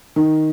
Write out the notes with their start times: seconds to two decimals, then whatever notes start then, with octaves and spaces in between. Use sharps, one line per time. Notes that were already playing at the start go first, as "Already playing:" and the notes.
0.16 D#3